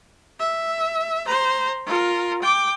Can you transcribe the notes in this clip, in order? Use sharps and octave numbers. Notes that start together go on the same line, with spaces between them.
E5
C5 A#5
F4 A#4
G5 D6